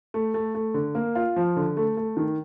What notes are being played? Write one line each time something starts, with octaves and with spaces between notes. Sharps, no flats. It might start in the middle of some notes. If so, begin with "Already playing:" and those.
A3
A3
A3
D3
A#3
F4
F3
D3
A3
A3
D#3